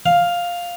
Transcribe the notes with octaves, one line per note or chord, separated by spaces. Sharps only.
F5